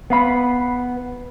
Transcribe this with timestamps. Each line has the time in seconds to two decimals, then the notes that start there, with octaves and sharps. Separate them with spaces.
0.10 B3 F5 B5